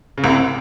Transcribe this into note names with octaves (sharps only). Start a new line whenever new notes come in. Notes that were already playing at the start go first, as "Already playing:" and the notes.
C#3
C2 C3